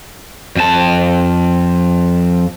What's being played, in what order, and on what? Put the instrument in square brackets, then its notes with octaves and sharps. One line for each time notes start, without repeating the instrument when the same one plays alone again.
[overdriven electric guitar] F2 A5